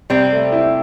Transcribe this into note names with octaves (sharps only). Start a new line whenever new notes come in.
C3 G3 C4
A3
E4